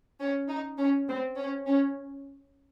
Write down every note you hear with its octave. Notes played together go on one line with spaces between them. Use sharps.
C#4
D#4
C#4
C4
C#4
C#4